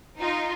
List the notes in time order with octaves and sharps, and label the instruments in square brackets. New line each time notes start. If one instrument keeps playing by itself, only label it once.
[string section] D#4 F4